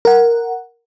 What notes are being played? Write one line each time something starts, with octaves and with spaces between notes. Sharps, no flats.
A#4 F#5